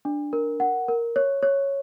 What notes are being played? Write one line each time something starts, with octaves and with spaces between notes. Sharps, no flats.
D4
A#4
F#5
A#4
C#5
C#5